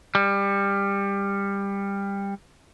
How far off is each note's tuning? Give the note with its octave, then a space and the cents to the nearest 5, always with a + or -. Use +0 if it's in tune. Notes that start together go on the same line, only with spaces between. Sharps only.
G3 +20